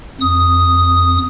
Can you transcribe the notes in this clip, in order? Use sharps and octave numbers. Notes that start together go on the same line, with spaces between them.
F2 D#6